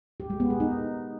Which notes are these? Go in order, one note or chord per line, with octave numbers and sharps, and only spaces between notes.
G4
G#3
B3
G#4
D#4